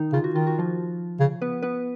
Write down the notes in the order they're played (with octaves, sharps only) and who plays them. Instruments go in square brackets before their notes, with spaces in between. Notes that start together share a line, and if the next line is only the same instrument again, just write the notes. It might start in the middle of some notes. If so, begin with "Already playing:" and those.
Already playing: [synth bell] D#3 D#4
[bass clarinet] C#3 [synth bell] F4
[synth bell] F#4
[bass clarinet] D#3 [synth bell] F4
[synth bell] F#4
F3 F4
[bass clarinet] C#3
[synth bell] B3 B4
B3 B4